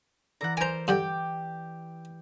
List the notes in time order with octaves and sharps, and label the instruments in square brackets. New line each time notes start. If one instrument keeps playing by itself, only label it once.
[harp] E3 A4 D5 [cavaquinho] F#5 A#5
[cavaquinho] A#4 C5 [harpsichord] G#5 A#5
[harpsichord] G2 D3 [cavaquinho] G4 G5